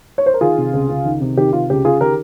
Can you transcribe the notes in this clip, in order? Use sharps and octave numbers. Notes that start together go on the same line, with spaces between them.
C#5
C5
A#4
D#3 F4 G#4
C3
C#2
C#2
D#3
C3
D#3 G4
C3 F4
C#2 G4
C#2 F4 G#4
D#3 G4 A#4